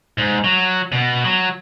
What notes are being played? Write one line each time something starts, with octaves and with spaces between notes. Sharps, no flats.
G#2
F#3
B2
F#3